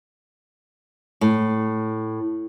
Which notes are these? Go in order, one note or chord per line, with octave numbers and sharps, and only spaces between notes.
A2